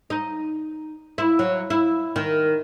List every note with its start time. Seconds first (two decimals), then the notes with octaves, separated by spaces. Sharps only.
0.10 D#4
1.18 E4
1.39 F#3
1.70 E4
2.16 D#3